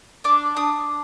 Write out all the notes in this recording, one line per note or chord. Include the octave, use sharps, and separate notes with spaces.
D4 D6
D4 D#6